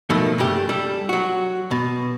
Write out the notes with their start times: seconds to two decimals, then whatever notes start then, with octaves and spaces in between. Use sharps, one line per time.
0.10 B2 D#3 F3 F#3 A3
0.38 G2 C#3 A3 G4
0.69 G3 A4
1.09 F#3 F#4
1.71 B2